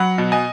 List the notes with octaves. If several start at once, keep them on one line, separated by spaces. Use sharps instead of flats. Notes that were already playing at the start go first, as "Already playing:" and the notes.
Already playing: F#3 F#5 B5
B2
D#5 G#5